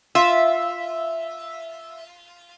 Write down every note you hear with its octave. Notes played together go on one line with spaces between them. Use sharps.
F4 E5